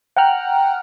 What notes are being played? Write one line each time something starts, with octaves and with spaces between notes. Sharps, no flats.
F#5 G5 A#5 F6 F#6